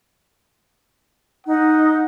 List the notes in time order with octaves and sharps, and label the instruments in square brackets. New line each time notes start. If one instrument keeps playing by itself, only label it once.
[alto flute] D#4 [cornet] F#5